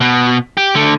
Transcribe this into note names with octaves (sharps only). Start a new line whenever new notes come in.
B2
G4
D3 A3